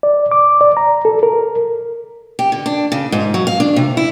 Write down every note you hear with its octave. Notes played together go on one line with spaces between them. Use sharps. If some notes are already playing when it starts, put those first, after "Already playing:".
D5
D6
D5
A#5
A4
A#4
G4
D3
D4
C#3
G#2
F#3
F5
D4
C3
E4